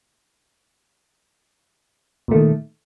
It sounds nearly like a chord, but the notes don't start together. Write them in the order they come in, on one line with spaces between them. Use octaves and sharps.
A#2 A3 D#3